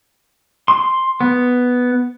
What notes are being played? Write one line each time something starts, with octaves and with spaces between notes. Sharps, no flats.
C6
B3